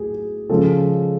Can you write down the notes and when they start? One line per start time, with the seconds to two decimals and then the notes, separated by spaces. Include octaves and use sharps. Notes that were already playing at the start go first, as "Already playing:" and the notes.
Already playing: A2 F#3 G4 G#4
0.49 C#3 F3 G#3 A4